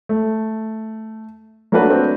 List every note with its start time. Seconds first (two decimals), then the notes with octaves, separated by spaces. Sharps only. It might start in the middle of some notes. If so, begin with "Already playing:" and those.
0.09 A3
1.72 F#3 A3 A#3 D4 F#4 B4
1.91 C4